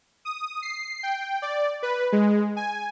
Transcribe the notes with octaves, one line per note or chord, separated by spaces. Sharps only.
D#6
C7
G5
D5
B4
G#3
G#5